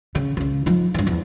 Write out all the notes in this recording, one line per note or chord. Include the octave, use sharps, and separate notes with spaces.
C#3
C#2 C#3
F3 D#4
G2 E3
E2 F3